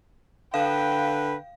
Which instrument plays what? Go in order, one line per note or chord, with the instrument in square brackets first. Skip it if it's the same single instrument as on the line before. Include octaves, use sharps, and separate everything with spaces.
[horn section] D3 B4 B5 [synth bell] F5 [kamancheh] G5